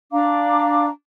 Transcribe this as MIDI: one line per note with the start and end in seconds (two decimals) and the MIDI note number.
0.11 0.88 62
0.11 0.88 77
0.11 0.88 82
0.11 0.88 86